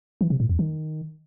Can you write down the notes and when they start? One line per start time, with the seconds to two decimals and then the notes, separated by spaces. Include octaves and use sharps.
0.21 E3
0.30 C3
0.40 A2
0.49 E2
0.59 D#3